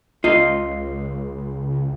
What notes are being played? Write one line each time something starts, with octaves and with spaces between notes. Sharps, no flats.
C#2 F4 D#5